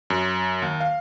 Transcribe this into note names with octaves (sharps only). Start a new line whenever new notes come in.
F#2
D#2
F5